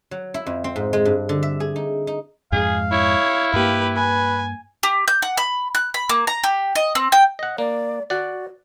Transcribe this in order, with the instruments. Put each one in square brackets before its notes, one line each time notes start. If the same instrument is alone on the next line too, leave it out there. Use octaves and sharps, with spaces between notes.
[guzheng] F#3
E4
F2
C4
G#2
G#3
G2
D3
E5
G#4
D#4
D#4
[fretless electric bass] F2 G#2 G#3 [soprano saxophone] G#4 [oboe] F5
[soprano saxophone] E4 [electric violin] C#5
[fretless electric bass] G2 A#3 [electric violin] G4 B4
[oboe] B4 [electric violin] G#5
[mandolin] G4
G6
F#5
B5
F#6
B5
A#3
A#5
G4
D#5
C4
G5
[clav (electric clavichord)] D#5 F#5
[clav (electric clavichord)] A#3 [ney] D5
[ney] F#4 [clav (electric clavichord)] D5 F#5